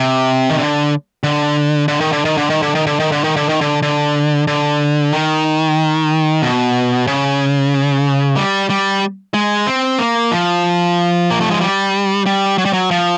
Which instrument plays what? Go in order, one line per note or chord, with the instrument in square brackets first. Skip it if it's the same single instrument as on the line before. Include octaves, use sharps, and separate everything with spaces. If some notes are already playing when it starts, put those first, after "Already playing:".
Already playing: [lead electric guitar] C3
D#3
D3
D3
D3
D#3
D3
D#3
D3
D#3
D3
D#3
D3
D#3
D3
D#3
D3
D#3
D3
D3
D3
D#3
B2
C#3
G3
G3
G#3
C4
A#3
F3
A#3
A3
G#3
G3
G3
F#3
G3
F#3
F3